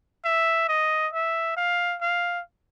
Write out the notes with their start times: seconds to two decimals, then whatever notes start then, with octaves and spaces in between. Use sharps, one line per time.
0.24 E5
0.69 D#5
1.13 E5
1.57 F5
2.01 F5